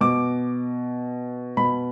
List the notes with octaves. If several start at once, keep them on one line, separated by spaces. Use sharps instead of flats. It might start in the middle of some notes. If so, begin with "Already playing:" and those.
B2 D6
B2 B5